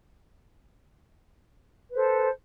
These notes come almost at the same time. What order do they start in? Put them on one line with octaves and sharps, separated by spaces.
B4 C5 A4